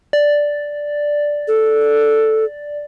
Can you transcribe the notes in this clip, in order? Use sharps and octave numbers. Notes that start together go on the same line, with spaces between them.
D5
A4